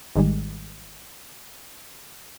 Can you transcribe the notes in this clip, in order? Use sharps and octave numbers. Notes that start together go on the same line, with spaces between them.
G#1 G#2 D#3 G3 G#3